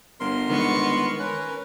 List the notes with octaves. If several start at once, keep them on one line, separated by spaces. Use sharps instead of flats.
G1 A#4 C6
D#3 G#3 B3 C#6
C#4 A#4 B4